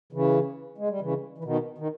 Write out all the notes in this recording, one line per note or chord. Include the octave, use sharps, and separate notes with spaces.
C#3 E3
G#3
G3
C#3 E3
E3
B2 D#3
D#3